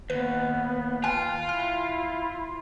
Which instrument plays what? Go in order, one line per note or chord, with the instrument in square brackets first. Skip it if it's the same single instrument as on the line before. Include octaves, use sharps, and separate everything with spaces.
[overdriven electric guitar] D#2 [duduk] B3 [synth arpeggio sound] B4
[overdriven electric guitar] F4 [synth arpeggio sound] G5 G#5 F#6
[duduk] E4 [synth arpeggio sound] F6